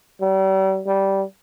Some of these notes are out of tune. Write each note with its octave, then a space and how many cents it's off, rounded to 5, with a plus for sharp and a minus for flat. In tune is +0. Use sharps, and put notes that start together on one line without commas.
G3 -40
G3 -10